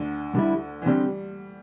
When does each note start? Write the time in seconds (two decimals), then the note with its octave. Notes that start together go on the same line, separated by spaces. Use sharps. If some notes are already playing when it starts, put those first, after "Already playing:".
Already playing: D2 D3
0.35 D3 G3 E4
0.82 E3
0.86 D3 G3 C4 G4